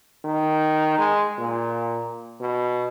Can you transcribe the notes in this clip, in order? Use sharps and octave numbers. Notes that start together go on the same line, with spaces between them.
D#3
G#3
A#2
B2